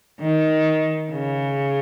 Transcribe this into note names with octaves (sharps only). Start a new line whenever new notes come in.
D#3
C#3